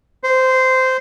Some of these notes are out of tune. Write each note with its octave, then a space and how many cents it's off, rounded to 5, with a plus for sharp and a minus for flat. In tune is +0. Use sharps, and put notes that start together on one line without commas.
C5 -15